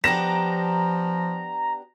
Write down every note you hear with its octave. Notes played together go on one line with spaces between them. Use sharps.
F3 B3 D4 G4 A#5 A#6 E7